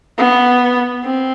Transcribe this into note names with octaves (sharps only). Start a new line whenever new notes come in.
B3
C4